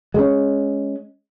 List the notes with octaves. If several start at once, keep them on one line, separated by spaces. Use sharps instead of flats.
G#3 B3 C#4